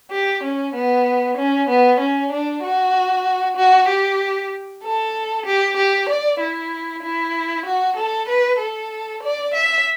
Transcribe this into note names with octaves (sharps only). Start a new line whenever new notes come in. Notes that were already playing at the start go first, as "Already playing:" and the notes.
G4
C#4
B3
C#4
B3
C#4
D4
F#4
F#4
G4
A4
G4
G4
D5
E4
E4
F#4
A4
B4
A4
D5
E5